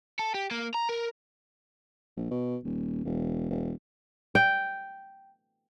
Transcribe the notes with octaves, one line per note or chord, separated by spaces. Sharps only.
A4
G4
A#3
A#5
A#4
A#1
B2
D#1
E1
E1
G5